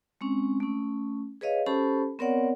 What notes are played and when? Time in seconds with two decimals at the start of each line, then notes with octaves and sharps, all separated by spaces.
0.21 G#3 C4 C#4
0.60 A3 C#4
1.41 G#4 B4 C#5 D#5 F5
1.66 C#4 G4 A4 C5 A5 B5
2.19 B3 C4 A#4 C#5 D5 F#5